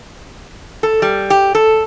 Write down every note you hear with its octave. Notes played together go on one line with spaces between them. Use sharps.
A4
G3
G4
A4